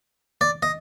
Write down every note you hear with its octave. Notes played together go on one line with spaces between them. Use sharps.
D5
D#5